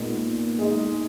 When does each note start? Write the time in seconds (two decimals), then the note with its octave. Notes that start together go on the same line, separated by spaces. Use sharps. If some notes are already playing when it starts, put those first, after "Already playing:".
Already playing: A#2 G#3 B3 D#4 A#4
0.59 G#3 D#4 G#4